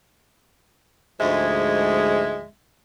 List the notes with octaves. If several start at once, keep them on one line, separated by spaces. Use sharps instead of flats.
D2 G#2 F3 G#3 G#4 E5